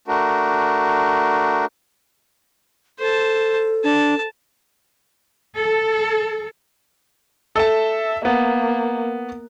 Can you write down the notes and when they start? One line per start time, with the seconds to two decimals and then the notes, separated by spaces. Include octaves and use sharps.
0.08 A3 D4 F#4 A#4
3.00 A4 C5 A5
3.84 D4 A5
5.59 A4
7.56 A4 E5 A5
8.25 A#3 B3